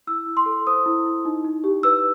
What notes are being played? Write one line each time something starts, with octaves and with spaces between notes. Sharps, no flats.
E4 E6
E4
C6
A4
C5 D#6
E4
E4
D#4
D#4
G4
B4 E6